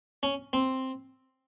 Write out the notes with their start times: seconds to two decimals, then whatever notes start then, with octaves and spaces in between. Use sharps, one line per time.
0.23 C#4
0.53 C4